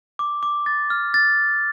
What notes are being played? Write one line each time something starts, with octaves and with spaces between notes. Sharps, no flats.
D6
D6
A6
F6
A6